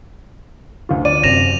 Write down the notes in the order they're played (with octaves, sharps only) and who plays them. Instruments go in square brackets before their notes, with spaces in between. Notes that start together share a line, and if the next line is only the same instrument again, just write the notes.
[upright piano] D2 F4
[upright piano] D5 [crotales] D#7
[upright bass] F#2 [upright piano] C3 [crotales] A#6 E7 F7